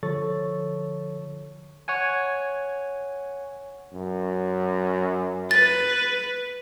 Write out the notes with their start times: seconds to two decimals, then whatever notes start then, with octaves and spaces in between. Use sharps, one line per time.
0.03 D3 F3 A4 C#5 C#6 A6
1.88 C#5 F#5 G#5
3.93 F#2
5.51 B4 A6